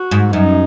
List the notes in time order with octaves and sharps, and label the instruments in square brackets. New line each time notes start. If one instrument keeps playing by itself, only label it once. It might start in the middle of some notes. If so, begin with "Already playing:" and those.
Already playing: [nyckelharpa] F#4
[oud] G#2
[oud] F#2 [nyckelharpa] D#4